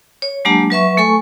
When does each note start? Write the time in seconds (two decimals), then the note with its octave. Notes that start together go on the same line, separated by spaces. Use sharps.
0.22 C#5
0.45 F#3 G#3 A#3 D4 G4 A5
0.70 F#3 B4 E5 C#6
0.97 A3 A4 G#5 C#6